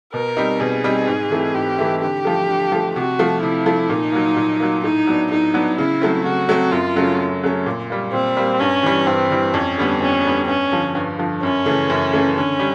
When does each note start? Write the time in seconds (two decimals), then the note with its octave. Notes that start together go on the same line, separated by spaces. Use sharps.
0.13 B2 A#4
0.37 G3 C4 D#4
0.60 B2 G#4
0.84 G3 C4 D#4
1.07 G#2
1.30 E3 A3 C4 E4
1.54 G#2 G4
1.78 E3 A3 C4 E4
2.02 D3 G4
2.25 F3 A3
2.49 D3
2.72 F3 A3
2.95 C3 F#4
3.19 F3 A3
3.42 C3 E4
3.66 F3 A3
3.90 A#2 D#4
4.12 F#3 A#3
4.36 A#2
4.60 F#3 A#3
4.84 A2 D#4
5.07 F#3 B3 D4
5.31 A2 D#4
5.54 F#3 B3 D4
5.78 C#3 E4
6.02 F#3 A3 C4
6.24 C#3 F#4
6.49 F#3 A3 C4
6.71 F#2 F4
6.96 C#3 F#3 A3 C#4
7.19 F#2
7.43 C#3 F#3 A3 C#4
7.66 A#2
7.90 G3 A#3
8.13 A#2 C4
8.37 G3 A#3
8.60 G2 C#4
8.83 E3 G3
9.07 G2 C4
9.31 E3 G3
9.54 F2 C#4
9.78 D3 G3 B3
10.01 F2 C#4
10.25 D3 G3 B3
10.48 G2 C#4
10.72 D3 F3
10.95 G2
11.18 D3 F3
11.42 F#2 C#4
11.66 C#3 E3 A3
11.90 F#2
12.13 C#3 E3 A3
12.37 D3 C#4
12.59 G3